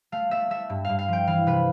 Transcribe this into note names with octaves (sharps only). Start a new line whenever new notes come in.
A3 F5
A3 E5
A3 E5
G2
G2 F5
F5
F3 G5
E3 F5
C3 B4